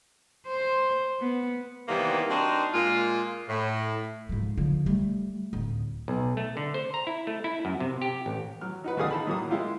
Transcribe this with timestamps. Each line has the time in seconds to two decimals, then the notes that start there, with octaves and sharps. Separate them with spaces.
0.47 C5
1.20 B3
1.88 C3 D#3 E3 G3 A#3 B3
2.30 C4 D4 D#4 F#4 A#4 C5
2.74 A#2 G#3 A#3 F4
3.49 A2
4.29 G#2 F3
4.58 D3 F3
4.86 G3 A3
5.53 D1
6.08 B1
6.37 A3
6.57 D3
6.74 C5
6.94 A#5
7.07 E4
7.27 A3
7.44 E4
7.65 F#2
7.80 C3
8.02 G4
8.26 A1
8.61 F#3 F6
8.84 D#4 F#4 B4
8.97 A1 E2 A3 G#4 F5 D#6
9.11 D#4 A5 B5
9.27 A2 F#3 A#3 D#6
9.50 G#3 E4 F4 G4